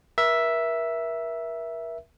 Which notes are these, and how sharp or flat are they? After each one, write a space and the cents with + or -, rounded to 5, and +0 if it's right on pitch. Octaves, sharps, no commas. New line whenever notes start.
A#4 +40 E5 +0